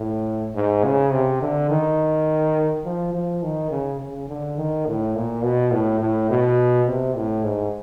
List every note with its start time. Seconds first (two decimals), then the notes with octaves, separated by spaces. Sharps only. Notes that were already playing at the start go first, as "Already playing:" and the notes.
Already playing: A2
0.55 G#2
0.84 C#3
1.12 C3
1.42 D3
1.70 D#3
2.85 F3
3.14 F3
3.43 D#3
3.71 C#3
4.00 C#3
4.29 D3
4.58 D#3
4.87 A2
5.15 A#2
5.43 B2
5.72 A2
6.01 A2
6.30 B2
6.87 C3
7.16 A2
7.44 G#2